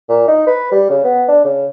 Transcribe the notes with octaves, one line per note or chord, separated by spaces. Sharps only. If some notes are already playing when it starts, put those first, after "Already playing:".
A#2
D#4
B4
G3
C#3
B3
D4
C#3